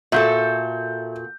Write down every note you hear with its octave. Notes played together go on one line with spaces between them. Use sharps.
A#2 F#4 A4 E5 G6